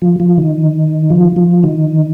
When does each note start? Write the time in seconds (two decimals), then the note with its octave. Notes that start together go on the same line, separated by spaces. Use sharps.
0.02 F3
0.20 F3
0.38 D#3
1.10 F3
1.36 F3
1.64 D#3